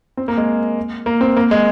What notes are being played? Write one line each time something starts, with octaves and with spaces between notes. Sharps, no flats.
C4
A#3
G#3
A#3
C4
A#3
G#3